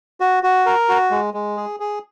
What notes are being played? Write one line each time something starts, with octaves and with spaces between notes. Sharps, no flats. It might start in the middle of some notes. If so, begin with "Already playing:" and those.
F#4
F#4
A#4
F#4
G#3
G#3
G#4
G#4